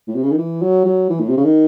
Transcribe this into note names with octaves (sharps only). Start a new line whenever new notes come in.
A2
C3
C#3
D#3
E3
F#3
F#3
E3
A2
C3
C#3
D#3